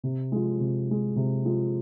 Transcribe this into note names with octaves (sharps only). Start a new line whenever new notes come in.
C3
F3 G#3
C3
F3 G#3
C3
F3 G#3